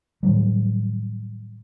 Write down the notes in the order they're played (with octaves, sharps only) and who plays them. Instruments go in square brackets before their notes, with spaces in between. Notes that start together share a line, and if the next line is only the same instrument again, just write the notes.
[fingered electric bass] A2 D#3 F#3 G3